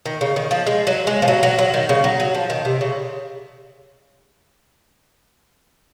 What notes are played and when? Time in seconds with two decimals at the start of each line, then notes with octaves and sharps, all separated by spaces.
0.06 D#3
0.21 C#3
0.36 D#3
0.51 F3
0.67 G#3
0.87 F#3
1.07 G#3
1.22 F3
1.28 F#3
1.43 F#3
1.59 F#3
1.74 D#3
1.89 C#3
2.04 F#3
2.20 F#3
2.35 F3
2.50 D#3
2.65 C3
2.81 C#3